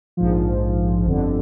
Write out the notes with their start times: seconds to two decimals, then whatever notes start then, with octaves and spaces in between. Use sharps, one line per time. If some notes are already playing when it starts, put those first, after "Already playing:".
0.17 A#1 G#2 F3
1.06 G1 F2 D3